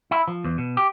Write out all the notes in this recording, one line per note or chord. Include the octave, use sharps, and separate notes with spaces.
E4
F3
E2
B2
G4